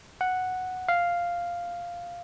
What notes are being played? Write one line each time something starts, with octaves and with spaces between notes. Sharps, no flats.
F#5
F5